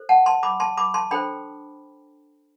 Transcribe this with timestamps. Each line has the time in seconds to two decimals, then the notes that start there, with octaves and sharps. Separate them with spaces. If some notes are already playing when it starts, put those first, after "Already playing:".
Already playing: A4 C5
0.09 F#5 A5
0.26 A5 C6
0.43 B5 D6
0.60 A5 C6
0.77 B5 D6
0.94 A5 C6
1.11 D4 A4 C5 G5 B5